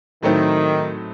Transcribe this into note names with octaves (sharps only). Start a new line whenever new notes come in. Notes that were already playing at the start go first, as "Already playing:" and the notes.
A2 D#3 F#3 A3 C4 D#4